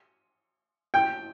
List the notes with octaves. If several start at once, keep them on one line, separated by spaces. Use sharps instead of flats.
G5